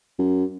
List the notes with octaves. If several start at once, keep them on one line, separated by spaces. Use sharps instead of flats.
F#2